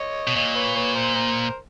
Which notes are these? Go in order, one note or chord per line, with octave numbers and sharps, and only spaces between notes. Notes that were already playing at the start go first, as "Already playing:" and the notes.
Already playing: C#5 D#5
B2
A#2 C#5 D#5
B4 C#5
B4 C#5
A#4 C5
A#4 C5